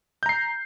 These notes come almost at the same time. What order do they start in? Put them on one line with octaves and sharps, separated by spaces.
G6 A#5 C7